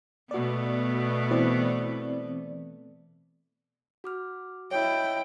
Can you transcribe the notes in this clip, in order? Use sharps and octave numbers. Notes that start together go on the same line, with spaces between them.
B2 A3 B3 F#4 D5
E3 C4 D5
F#4 D6 F6
E4 C#5 D#5 G5